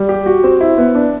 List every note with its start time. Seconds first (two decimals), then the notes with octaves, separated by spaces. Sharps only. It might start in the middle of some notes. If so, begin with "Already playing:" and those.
Already playing: G3
0.09 G4
0.26 F#4
0.44 C4
0.61 E4
0.78 B3
0.95 D4